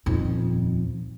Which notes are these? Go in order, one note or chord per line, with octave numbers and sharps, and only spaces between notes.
D#1 F2